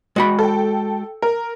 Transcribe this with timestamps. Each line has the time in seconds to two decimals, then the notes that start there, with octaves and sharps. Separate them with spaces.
0.16 G#3 F#4 B5
0.39 A4 G5
1.22 A#4